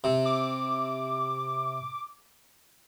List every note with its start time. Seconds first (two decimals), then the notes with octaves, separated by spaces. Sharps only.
0.04 C3
0.26 D6